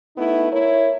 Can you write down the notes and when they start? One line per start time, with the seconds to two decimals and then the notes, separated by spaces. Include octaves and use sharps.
0.17 A3 B3 D#4 E4
0.52 E4 A#4 C#5